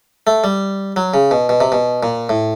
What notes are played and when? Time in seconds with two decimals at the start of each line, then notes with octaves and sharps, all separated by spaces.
0.27 A3
0.44 G3
0.96 F#3
1.14 C#3
1.31 B2
1.49 B2
1.60 C3
1.72 B2
2.03 A#2
2.29 A2